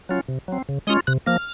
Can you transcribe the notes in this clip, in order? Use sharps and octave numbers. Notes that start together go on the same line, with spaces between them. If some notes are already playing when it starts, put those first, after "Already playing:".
F#3 C#4 F4
C3
F#3 C4
C#3
G#3 C#4 F4 D#6
C3 F#6
F3 A#3 F6